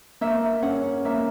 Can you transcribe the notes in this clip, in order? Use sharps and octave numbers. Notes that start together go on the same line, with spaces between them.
A#3 E5
C#4 F#5
A#3 E5